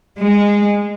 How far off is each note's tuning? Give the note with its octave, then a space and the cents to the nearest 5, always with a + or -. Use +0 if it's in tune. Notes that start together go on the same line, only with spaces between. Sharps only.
G#3 -20